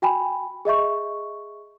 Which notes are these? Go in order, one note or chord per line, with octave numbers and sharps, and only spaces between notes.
F#4 G5 G#5 B5
G#4 D#5 E5 C#6